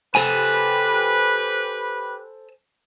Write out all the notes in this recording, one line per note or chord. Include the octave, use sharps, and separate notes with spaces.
G4 A4 B4 C5 G#5